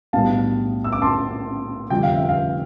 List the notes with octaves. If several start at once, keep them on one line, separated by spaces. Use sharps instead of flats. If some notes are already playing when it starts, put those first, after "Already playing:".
B1 A2 G3 B3 D4 F5 A5
E6
D6
A5 C6
F1 F2 D3 G3 G5
F5
E5
F5